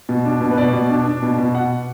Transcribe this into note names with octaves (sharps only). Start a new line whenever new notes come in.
B2
D4
B2
B4
B2 D5
B2
D4
D4
B2
B2
B2 F#5